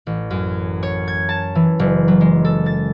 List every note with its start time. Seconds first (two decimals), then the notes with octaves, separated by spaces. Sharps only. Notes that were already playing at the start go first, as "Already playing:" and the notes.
0.07 A1
0.31 F#2
0.83 C#5
1.08 G#6
1.29 A5
1.55 E3
1.79 F#1
2.08 F#3
2.21 G#3
2.45 A4
2.66 A6